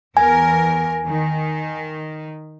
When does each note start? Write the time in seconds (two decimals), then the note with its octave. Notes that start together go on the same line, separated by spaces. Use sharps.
0.17 E2 A#4 G#5
1.05 D#3